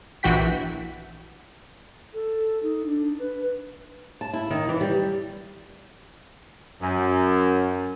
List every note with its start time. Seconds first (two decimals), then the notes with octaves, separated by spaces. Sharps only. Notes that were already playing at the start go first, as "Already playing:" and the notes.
0.23 A#1 E3 F#4 G5 B6
2.14 A4
2.63 D#4
2.86 D4
3.19 B4
4.21 A5
4.34 E4
4.51 D#3
4.69 E3
4.81 G3
6.82 F#2